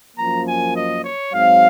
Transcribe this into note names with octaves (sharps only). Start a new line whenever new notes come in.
F#2 F3 A#3 A#5
G#5
D#5
C#5
G#2 F#3 C4 F5